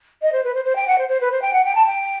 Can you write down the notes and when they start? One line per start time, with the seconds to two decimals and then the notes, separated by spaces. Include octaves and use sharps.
0.21 D#5
0.32 C5
0.43 B4
0.54 C5
0.64 C5
0.75 G5
0.87 F#5
0.98 C5
1.08 C5
1.20 B4
1.31 C5
1.41 G5
1.52 F#5
1.64 G5
1.74 A5
1.85 G5